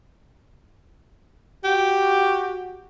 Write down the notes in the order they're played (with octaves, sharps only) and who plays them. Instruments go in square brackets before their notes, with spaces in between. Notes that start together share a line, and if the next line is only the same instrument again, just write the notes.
[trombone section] F#4 [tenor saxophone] G4